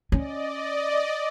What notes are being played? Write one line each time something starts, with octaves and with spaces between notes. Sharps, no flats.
C#4 D5 D#5